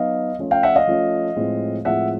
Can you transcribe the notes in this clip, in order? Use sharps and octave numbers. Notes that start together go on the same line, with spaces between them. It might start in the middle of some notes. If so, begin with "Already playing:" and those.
Already playing: F#3 B3 D#4 D#5 F5
F3 A3 C#4 F4
F5 G5
E5 F#5
D#5 F5
F3 A3 C#4 F4
A2 F3 G#3 C4
A2 F3 G#3 C4 E5 F#5